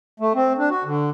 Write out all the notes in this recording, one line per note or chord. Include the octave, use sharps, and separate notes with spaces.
A3
C4
D4
F#4
D3